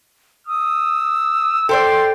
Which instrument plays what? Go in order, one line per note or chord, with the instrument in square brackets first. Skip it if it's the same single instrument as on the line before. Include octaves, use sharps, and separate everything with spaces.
[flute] D#6 [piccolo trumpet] E6
[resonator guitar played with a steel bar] A4 C5 D5 [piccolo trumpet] G5 [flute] C6